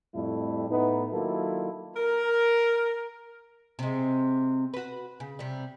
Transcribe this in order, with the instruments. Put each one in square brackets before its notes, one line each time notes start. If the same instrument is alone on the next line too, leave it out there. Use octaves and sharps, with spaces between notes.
[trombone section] F2 A2 G3 A3 E4
A2 A3 B3 D#4
D#3 F#3 A#3 E4 F4 A4
[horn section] A#4
[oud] C3 G#3
F#4 B4
C#3
C3 G3